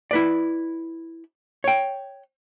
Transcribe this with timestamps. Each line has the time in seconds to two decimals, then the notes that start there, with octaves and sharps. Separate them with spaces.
0.11 E4 B4 D5
1.64 C#5 G5